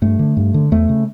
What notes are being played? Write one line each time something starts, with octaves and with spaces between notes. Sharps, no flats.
G2 A3
D3
G2
D3
E2 A3
C#3